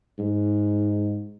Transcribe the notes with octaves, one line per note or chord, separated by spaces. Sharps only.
G#2